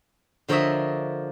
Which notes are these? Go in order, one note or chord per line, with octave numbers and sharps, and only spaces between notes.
D3 F3 A#4 C#5 D#5 E5